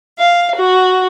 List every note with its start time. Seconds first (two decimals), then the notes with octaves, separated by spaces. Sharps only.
0.19 F5
0.55 F#4